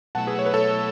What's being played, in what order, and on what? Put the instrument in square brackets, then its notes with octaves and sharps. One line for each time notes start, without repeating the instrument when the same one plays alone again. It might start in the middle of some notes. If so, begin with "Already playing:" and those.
[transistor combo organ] B2 F#3 A3 E4 [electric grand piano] F#5 A5
[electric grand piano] G#4 B4
C#5
B4
A4 C#5